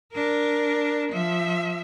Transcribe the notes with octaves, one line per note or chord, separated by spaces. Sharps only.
D4 A#4
F3 E5